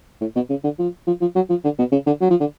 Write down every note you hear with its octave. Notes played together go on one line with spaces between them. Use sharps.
A2
B2
C#3
D3
F3
F3
F3
F#3
F3
D3
B2
C#3
D3
F#3
F3
D3